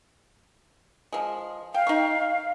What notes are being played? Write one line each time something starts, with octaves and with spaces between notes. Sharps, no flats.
F3 G#3
F5 G5
D#4 C#6